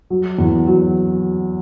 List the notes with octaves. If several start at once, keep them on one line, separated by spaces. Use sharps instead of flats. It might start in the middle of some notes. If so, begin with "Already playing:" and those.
F#3
E2
F#3